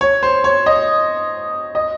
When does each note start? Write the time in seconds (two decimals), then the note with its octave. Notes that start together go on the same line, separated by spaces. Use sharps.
0.01 C#5
0.23 C5
0.44 C#5
0.66 D#5
1.75 D#5